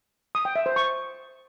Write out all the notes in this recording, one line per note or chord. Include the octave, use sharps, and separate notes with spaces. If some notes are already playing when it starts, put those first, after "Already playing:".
D#6
G5
E5
C5
C#6